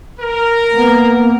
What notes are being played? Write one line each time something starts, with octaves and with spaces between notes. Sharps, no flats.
A#4
A#3 B3